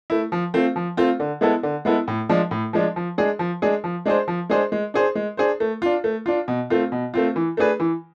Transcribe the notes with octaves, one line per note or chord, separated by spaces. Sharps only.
A3 E4
F3
A3 C4 F4
F3
A3 C4 F4
D3
G#3 B3 E4 A4
D3
G#3 B3 E4 A4
A2
F3 G#3 D4
A2
F3 G#3 D4
F3
G#3 D4 G#4
F3
G#3 D4 G#4
F3
G#3 D4 G#4 C5
F3
G#3 D4 G#4 C5
G#3
D4 G#4 C5
G#3
D4 G#4 C5
A3
D4 F4
A3
D4 F4
B2
A3 C4 F4
B2
A3 C4 F4
E3
A3 D4 G#4 B4
E3